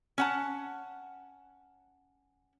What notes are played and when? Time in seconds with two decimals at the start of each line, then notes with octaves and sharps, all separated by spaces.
0.18 C#4 F#5 A5